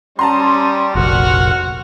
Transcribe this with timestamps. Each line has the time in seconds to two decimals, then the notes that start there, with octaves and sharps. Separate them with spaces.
0.19 G3 C#4 A5 A#5 C6 D#6
0.95 F1 A#1 F#4 F#5 F6